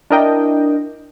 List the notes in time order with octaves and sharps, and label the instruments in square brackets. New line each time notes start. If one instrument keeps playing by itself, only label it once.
[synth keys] D4 E4 A#4 D#5 G5